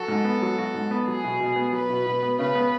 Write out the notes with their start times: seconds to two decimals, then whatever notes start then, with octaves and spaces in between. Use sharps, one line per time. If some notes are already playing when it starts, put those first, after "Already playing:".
Already playing: F#3 F#4 A4
0.08 G#2
0.24 B3
0.42 F#3
0.58 F#4
0.74 G#2
0.91 B3
1.07 F#3 G#4
1.24 B2
1.40 B2
1.56 B3
1.72 F#3 B4
1.90 B2
2.06 B2
2.22 B3
2.39 C#3 B4
2.55 B3